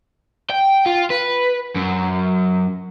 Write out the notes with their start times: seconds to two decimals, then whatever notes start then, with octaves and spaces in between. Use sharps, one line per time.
0.50 G5
0.86 F4
1.10 B4
1.76 F#2